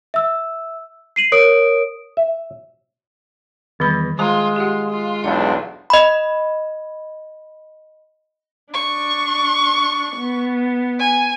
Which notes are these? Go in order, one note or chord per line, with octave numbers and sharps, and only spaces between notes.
E5 E6
C7 D#7 F#7
A#4 C#5 D#6 D7
E5
E2 D#3 G3 B5
G#3 F4 C5 A5 A#5
F4 G4 F#5
F4
B1 E2 D4 F5
D#5 B5
D4 C#6
B3
G#5